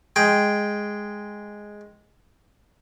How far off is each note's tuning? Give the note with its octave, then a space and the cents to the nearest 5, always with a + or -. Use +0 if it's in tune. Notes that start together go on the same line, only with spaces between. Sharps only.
G#3 +0 G5 +0